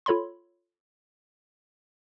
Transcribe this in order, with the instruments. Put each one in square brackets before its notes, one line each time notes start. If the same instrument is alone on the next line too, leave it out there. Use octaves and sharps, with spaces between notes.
[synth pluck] F4 A4 C#5 B5 C6